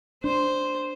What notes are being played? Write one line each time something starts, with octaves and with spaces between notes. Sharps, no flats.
D4 C5